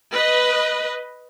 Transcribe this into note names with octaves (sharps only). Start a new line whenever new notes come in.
B4 D#5